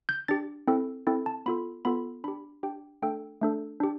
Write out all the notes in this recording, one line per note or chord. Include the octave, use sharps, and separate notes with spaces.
G6
D4 G4 A6
C4 E4 A4
C4 E4 A4
A5
B3 F4 A4 B5
B3 F4 A4 B5
D4 G4 B5
D4 G4 G5
A3 D4 A4 G5
A3 D4 A4
D4 G4